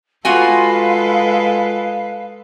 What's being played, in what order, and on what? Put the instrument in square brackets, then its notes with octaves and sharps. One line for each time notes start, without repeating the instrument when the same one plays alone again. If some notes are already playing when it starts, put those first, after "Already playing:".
[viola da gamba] G#3 A4 B4 [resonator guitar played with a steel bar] F4 F#4 G#5 [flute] F5